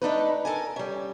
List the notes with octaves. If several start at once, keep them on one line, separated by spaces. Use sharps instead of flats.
A3 D4 D#4 B4
A4 A#4 G#5
G3 C#4